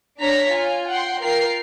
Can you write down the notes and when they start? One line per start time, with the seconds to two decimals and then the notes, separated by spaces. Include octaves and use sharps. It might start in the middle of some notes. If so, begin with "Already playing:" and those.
0.18 D4 C#5 A#5 B6
0.50 F4 G#5
0.88 F#5 G5 C6
1.21 F4 A#4 G5 C7